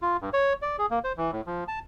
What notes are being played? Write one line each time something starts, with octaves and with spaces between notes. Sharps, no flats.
F4
G2
C#5
D5
G#4
A#3
C5
E3
A2
F3
A5